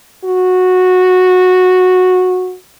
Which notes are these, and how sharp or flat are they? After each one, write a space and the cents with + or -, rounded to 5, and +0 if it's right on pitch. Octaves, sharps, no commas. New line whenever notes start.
F#4 -10